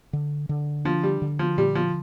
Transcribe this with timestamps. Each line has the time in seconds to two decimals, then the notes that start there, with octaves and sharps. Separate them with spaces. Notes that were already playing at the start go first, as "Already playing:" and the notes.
0.13 D3
0.49 D3
0.85 F3 D4
1.03 G3
1.22 D3
1.39 F3
1.58 A#2 G3
1.75 F3